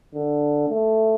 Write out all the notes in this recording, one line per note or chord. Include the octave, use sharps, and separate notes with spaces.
D3
A3